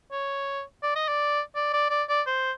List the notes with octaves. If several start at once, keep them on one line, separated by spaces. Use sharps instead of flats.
C#5
D5
D#5
D5
D5
D5
D5
D5
C5